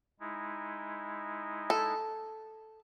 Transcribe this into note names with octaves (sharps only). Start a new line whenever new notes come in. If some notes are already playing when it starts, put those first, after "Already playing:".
G#3 D#4 E4
A4